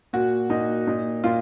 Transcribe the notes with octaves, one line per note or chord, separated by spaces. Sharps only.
A#2 F#4
A#2 D#4
A#2 D#4
A#2 F4